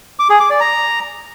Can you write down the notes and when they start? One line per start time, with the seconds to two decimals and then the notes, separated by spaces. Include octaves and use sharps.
0.19 D6
0.30 G#4
0.40 D6
0.50 D5
0.60 A#5